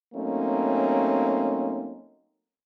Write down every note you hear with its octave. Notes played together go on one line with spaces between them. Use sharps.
F#3 A3 A#3 C4 C#4 D#4